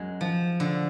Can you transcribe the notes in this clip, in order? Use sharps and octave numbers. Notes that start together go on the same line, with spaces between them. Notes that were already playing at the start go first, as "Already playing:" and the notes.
Already playing: F#2 G#3
F3
D3